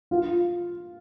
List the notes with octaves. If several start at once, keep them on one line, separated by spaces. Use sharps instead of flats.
F4